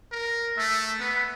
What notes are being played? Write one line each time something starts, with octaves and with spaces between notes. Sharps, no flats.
A#4
A3 E5
B3 B4